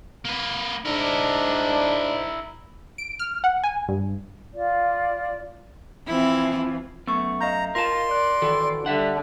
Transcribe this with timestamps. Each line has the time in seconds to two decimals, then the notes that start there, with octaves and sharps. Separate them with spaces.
0.25 A#3 B4
0.85 G#2 D4 E4 A#4
2.98 D7
3.19 F6
3.44 F#5
3.63 G#5
3.88 G2
4.53 F4 D5
6.07 E3 F3 C4 E4
7.07 F#2 A3 B3 C#6
7.41 D#5 F5 A#5 G6
7.75 F4 A#4 A5 C6
8.11 D5 F#6
8.42 D#3 E3 F#4 A4
8.86 D3 G3 E5 F#5